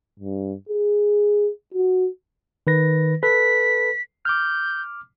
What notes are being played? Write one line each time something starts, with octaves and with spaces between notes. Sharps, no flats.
G2
G#4
F#4
D#3 B4 A#6
A4 B4 B6
D6 F6 G6